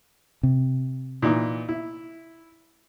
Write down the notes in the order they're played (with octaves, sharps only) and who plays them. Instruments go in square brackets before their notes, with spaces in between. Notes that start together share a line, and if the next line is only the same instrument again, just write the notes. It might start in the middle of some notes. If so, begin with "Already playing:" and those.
[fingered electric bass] C3
[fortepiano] A#2 E3 D#4
E4